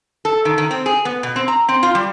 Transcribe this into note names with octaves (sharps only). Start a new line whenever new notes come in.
A4
D#3
D#3
C4
G#4
B3
B2
C4
A#5
C4
F4
G3